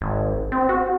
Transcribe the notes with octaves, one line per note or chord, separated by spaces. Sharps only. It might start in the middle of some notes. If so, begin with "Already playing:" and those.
G#1
C4
F#4